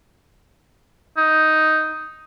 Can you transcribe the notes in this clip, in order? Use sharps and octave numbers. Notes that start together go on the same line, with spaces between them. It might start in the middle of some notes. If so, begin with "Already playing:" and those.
D#4